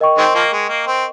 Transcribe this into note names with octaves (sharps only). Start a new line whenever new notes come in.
A#4 D#5 G5 C#6
D#3 G#3 C4
F3 A#3
G#3
A#3
C4